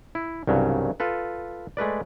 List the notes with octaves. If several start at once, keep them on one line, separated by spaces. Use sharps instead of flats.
E4
C2 G2 C#3 F#3
F4 A4 B4
G#3 A3 B4 D5